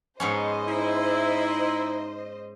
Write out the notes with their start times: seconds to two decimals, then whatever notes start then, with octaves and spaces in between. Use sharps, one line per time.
0.20 G#2 B3 C#4 C5 D#5
0.68 D#4 E4